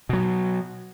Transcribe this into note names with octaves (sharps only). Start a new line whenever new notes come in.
B2 F#3